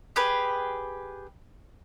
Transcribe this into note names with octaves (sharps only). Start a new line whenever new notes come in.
G4 G#4 B4